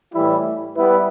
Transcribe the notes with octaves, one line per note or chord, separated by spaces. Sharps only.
A2 E3 G3 E4
G3 B3 E4 B4